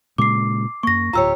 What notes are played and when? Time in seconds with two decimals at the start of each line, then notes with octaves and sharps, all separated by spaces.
0.18 A#2 C#3 G#3 D6 C7
0.83 F#2 A#3 C#6 A#6
1.13 D1 F4 G4 C#5 A#5 E6